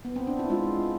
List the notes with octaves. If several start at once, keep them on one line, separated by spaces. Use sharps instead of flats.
B3
C4
D4
E4
G#3 F4